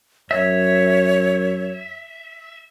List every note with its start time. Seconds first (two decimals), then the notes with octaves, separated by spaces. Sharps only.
0.31 F#2 C#5 E5